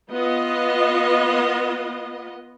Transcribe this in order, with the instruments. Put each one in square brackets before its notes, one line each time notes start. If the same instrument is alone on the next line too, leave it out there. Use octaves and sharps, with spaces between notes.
[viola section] B3 F4 D#5